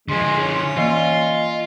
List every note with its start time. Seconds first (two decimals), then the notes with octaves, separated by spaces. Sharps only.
0.08 D3 F3 G#3 C6
0.39 C#4
0.76 E3 A#3 F4 D5 D#5